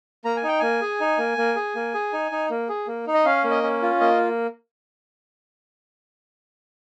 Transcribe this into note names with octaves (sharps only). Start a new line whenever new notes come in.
A#3 A#5
G#5
D#4 G5
A#3 G#5
G#4
D#4
A#3
A#3
G#4
A#3
G#4
D#4
D#4
A#3
G#4
A#3
D#4
D#5
C#4 F5
A#3
D#5
C#4
F4
A#3 D#5